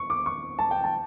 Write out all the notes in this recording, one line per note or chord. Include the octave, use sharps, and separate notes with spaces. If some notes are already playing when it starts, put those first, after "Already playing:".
Already playing: C#6
D6
C#6
A5
G5
A5